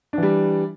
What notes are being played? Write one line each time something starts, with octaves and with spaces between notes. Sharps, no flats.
E3 G3 D4